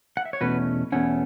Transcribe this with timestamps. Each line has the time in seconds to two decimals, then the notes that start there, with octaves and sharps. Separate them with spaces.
0.17 F#5
0.25 E5
0.33 C#5
0.41 E2 B2 A3 C#4 F#4 B4
0.92 E2 B2 A3 C#4 C#5 F#5